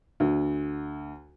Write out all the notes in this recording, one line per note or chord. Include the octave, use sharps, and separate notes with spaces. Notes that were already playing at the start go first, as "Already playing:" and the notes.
D2